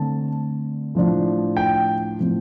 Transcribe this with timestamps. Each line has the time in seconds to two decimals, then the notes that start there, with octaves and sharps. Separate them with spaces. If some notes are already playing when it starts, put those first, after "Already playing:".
Already playing: D3 A3 C4 A5
0.95 A2 F3 D4
1.57 G5
2.19 A2 F3 C4